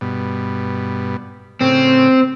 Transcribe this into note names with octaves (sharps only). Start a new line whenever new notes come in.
G2 B2
A2 C#3 C4